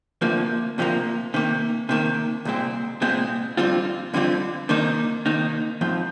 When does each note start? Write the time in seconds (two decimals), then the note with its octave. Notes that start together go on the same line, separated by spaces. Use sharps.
0.21 D2 C3 F3 A#3
0.78 D2 C3 F3 A#3
1.34 C3 D#3 A#3
1.89 C3 D#3 A#3
2.45 C2 A#2 G#3 C4
3.02 C2 A#2 G#3 C4
3.57 F2 D3 G3 C4 F4
4.14 F2 D3 G3 C4 F4
4.69 C3 D#3 A#3 D#4
5.26 C3 D#3 A#3 D#4
5.81 G#2 F3 C4